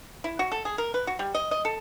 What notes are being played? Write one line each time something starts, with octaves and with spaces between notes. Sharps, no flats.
E4
F#4
A4
G#4
A#4
B4
F#4
G3
D#5
D#5
A4